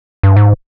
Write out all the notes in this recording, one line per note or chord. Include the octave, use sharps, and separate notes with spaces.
G2
G#2